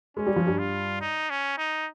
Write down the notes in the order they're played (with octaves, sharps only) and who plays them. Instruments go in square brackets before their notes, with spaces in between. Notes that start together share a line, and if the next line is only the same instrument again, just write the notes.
[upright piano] G#3 [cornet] C#4
[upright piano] G3
F3
G2 G3
[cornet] F4
D#4
C#4
D#4